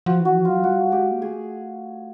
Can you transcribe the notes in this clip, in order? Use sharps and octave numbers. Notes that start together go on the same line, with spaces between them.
F3 F#4
E3 F#4
F3
F#3 F4
G3 F#4
G#3 G4
A#3
A3 G#4